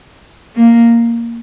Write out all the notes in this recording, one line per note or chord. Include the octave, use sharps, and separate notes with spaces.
A#3